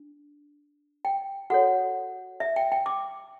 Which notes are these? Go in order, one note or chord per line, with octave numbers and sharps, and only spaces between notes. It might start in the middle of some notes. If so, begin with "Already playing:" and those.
Already playing: D4
G5
F#4 A4 C#5 F#5
E5
G5
G5
D6